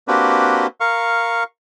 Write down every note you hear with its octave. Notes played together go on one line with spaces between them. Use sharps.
A#3 C4 D4 F#4 G4 B4
A#4 F5 C#6